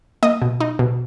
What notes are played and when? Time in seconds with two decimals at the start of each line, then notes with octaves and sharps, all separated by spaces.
0.23 A#3 D#5
0.42 B2
0.61 D#4
0.79 B2